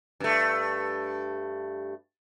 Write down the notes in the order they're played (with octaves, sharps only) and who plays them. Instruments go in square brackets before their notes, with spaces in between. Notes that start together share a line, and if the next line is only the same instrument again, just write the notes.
[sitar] G2 A3